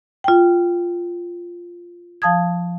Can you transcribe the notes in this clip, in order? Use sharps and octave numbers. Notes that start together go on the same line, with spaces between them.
F4 G5
F3 F5 A5 D#6 G#6